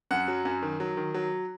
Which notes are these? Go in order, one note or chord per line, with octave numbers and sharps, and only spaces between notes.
F#2 F#5
F#3
F#2
D#3
F#3
D#3
F#3